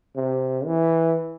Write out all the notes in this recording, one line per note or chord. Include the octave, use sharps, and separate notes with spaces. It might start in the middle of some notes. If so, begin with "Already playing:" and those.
C3
E3